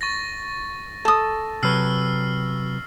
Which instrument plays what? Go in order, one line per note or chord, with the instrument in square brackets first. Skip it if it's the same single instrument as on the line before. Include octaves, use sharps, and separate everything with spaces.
[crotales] C#6 A6 A#6
[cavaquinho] A4 D#6
[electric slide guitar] C3 F#3 B4 [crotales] E6 F6 C7